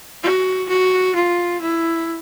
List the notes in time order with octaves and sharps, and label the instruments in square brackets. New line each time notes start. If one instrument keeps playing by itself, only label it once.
[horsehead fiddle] F#4
F#4
F4
E4